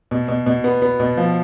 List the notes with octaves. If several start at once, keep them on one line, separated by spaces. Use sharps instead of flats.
B2
B2
B2
B3
B3
B2
F3